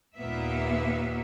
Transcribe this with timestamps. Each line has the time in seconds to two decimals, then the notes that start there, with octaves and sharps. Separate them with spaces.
0.16 D#2 A#2 A#3 B3 E5